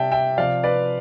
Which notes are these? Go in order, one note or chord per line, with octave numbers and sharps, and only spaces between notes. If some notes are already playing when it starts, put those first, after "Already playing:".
Already playing: C3 G3 D5 E5 G5 A5
E5 G5
C3 F3 D5 F5
B4 D5